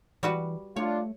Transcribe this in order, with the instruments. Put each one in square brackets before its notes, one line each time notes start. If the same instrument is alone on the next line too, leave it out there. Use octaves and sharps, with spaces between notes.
[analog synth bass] E3 [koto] G3 F#4 B4
[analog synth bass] A3 [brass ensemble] D4 F4 [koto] C#5